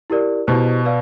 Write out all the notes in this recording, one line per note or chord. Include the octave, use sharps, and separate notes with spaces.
E4 G4 A#4 D5
B2 E4 G4 C5
B4 D5 F5